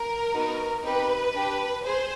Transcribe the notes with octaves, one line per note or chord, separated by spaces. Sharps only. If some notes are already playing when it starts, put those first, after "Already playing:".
Already playing: A#4
B3 D#4 F#4
C4 D#4 G4 B4
D4 G4
G#4 C5